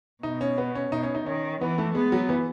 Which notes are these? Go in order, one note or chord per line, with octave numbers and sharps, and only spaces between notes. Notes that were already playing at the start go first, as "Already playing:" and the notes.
B2 D#4
C#4
B3
C#4
B2 D#4
C#4
D#4
D#3 C#4
E3 B3
A3
G#3 B3
F#3
E3